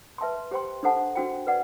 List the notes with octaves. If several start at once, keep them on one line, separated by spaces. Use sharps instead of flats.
B4 E5 A5 C6
G4 C5 G5 C6
D4 A4 C5 F#5 A5
D4 F#4 C5 G5
B4 D5 F#5